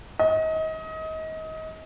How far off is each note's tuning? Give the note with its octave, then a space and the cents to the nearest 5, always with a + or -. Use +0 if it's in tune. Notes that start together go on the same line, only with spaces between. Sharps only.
D#5 +30